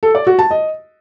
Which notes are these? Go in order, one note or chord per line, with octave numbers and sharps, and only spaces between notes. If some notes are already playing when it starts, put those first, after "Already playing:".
A4
D5
F#4
A5
D#5